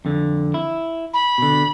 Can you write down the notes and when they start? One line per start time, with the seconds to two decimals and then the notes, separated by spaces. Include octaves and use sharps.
0.05 F2 D3
0.54 E4
1.14 B5
1.38 B2 D3